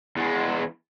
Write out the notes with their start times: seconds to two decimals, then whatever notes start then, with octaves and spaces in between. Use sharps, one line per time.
0.17 E2 G#3